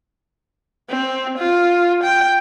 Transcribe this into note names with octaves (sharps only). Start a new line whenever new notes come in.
C4
F4
G5